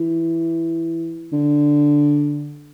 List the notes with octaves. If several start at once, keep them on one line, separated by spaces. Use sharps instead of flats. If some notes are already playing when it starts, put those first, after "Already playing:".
Already playing: E3
D3